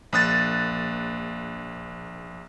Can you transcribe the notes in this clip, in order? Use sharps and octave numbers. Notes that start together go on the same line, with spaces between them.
A#1 A#3 D#6 F#6 A6